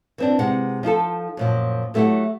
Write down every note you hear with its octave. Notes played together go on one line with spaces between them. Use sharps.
E3 C4 D4
C3 G#3 F#5
F3 D#4 F4 A4
F#2 A#2 F3
F#3 A3 C4 E4 G4 F#5